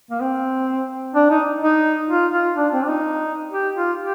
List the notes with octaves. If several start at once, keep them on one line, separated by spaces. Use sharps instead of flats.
A#3
C4
D4
D#4
D#4
F4
F4
D4
C4
D4
D#4
G4
F4
G4